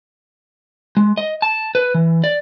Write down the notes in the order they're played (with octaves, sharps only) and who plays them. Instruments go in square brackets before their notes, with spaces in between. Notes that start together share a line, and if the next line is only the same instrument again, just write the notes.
[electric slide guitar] G#3
D#5
A5
B4
E3
D5